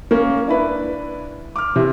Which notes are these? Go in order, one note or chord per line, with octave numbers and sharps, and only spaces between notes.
A#3 C#4
D4 E4 B4
D6 F6
C3 E3